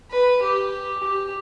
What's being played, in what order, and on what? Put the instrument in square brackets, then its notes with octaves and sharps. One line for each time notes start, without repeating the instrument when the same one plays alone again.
[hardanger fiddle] B4
G4
G4